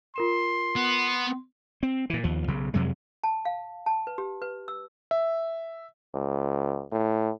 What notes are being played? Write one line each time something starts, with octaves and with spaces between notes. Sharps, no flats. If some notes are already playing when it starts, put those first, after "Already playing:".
F4 A#4 C6 E7
B3
C4
A#2 E3
D#2 F3
B1 C#3
F2 C3 F#3 G#3
A5
F5
A5
B4
G4
B4
E6
E5
C#2
A2